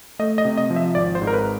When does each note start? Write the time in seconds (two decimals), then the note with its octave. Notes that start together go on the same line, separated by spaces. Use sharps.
0.19 A3 D#5
0.38 D#5
0.45 C3
0.57 D#5
0.70 F3
0.76 E5
0.95 G#1 D5
1.15 C5
1.22 G#2
1.27 A#4
1.33 B4